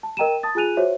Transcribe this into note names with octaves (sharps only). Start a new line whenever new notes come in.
A5
A#4 D#5 G5 A#5 D#7 E7
A5 D#6 A6
F4 G#4 G#5 F#6 D#7 F7
F#4 C5 C#5 E5